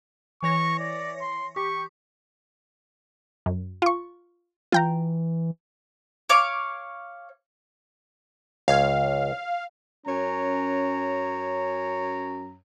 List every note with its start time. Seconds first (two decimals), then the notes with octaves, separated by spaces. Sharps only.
0.43 E3 C#5 C#6 A#6
0.79 D5
1.21 C6
1.56 G4 C#6
3.46 F#2
3.82 F4 C#6
4.72 E3 F4 G5 A#5
6.30 C#5 F5 D6
8.68 C#2 C#5 F5
10.07 F#2 C#4 C#5 A#5